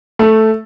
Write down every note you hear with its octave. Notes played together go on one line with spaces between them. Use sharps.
A3